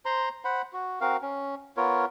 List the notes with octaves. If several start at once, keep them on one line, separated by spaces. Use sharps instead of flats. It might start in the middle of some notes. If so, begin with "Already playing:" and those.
C5 A#5 C6
C5 F#5 B5
F#4
C4 F#4 A#4 F5
C#4
B3 F4 A#4 C#5